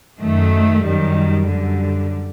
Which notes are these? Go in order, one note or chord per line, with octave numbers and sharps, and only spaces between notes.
F#2 D#3 A3
F#2 D#3 G3
F#2 D3 G3